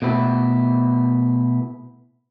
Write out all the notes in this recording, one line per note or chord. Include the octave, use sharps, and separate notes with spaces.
B2 A3 B3 E4